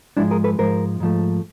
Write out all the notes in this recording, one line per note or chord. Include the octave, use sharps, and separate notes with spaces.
G#2 F3 G#3 D4 E4
G#4 A#4
A4 B4
G#2 F3 G#3 A#4 C5
G#2 F3 A3